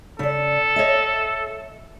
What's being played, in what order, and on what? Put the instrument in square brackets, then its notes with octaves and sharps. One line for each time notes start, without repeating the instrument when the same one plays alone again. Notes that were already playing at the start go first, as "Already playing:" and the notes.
[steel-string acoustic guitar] C#3 D5 [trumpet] A4
[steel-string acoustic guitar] C#5 D#5 E5